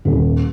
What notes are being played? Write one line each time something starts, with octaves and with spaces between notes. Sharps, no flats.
D#1